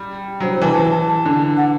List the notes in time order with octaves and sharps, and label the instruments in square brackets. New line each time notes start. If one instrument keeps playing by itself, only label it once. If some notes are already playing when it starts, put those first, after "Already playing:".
Already playing: [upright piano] G3
[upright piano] F#3 [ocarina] C5
[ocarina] C5
[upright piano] E3 [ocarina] A5
[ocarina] A5
A5
[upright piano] D3
[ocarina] F#5